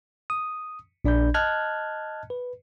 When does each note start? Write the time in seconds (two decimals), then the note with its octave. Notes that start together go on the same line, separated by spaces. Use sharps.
0.30 D#6
1.05 A#1 D4 D5 B5 G6
1.34 D#5 A5 F6 F#6 G#6
2.30 B4